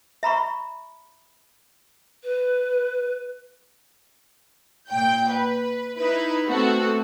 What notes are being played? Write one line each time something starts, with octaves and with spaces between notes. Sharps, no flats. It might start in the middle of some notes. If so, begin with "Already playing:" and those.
E5 A#5 B5 C#6
B4
A#2 G5 G6
B4
D#4 E4 B4
A3 B3 C4 F#4 A4